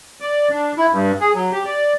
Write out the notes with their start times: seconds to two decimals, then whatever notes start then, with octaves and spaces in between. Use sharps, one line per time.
0.21 D5
0.50 D4
0.77 E4
0.92 G2
1.20 G#4
1.34 F#3
1.52 G4
1.65 D5